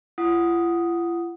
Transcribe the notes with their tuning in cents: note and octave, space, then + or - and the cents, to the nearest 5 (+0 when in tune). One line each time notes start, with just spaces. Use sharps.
F4 -45 F#5 +0 D#6 +0